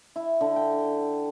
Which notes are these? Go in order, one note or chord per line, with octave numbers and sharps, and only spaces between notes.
E4
D3
G5